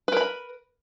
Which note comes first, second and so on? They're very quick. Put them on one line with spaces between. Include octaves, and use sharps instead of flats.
B4 A#4 B5